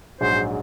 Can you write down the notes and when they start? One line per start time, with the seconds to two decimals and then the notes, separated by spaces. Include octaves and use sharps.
0.21 A#1 G#2 F#3 C5